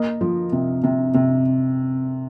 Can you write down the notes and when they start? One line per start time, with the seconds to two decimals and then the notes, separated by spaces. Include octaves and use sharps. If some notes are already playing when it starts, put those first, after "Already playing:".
Already playing: A#3 D#5
0.21 F3
0.52 C3
0.84 C3
1.14 C3